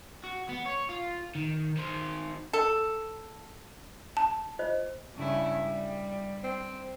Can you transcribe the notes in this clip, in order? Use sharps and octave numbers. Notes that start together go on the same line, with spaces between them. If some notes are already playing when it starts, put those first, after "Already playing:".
F#4
B3
C#5
F4
D#3
D#3 C5
A4
A5
F4 C5 D#5
G2 C#3 E4
G3
C4